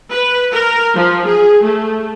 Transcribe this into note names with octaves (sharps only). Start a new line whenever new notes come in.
B4
A#4
F3
G#4
A3